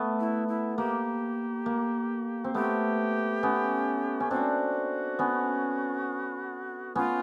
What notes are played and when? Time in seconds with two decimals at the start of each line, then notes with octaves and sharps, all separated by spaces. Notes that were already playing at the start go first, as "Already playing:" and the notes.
Already playing: A3 B3
0.20 E4
0.48 E4
0.78 A#3 G4
1.66 A#3
2.44 C4
2.54 A3 B3 G4
3.43 B3 C#4
4.20 C#4
4.31 C4 D4 F#4
5.19 B3 C#4
6.95 B3 C#4 F4